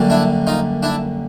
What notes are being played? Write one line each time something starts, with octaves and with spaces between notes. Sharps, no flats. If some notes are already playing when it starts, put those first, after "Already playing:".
Already playing: F#2 D3 G3 A#3
D4 E4
D#4 F4
D4 E4